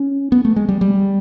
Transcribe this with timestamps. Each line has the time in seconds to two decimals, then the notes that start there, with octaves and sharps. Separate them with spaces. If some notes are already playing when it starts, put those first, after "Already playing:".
Already playing: C#4
0.32 B3
0.45 A3
0.56 G#3
0.69 G3
0.81 G3